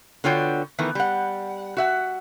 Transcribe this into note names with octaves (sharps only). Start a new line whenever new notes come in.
D3 B3 F4 F#4 C#5 G5
D#3 E3 A3 B3
G3 F#5
F#4 E5 F#5